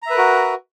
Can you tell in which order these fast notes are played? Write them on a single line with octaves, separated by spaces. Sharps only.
A#5 E5 B4 A#4 F#4